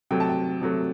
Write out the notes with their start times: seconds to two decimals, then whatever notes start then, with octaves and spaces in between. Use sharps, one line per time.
0.11 C3 F#3 A3 G5
0.20 A5
0.29 G5
0.62 C3 F#3 A3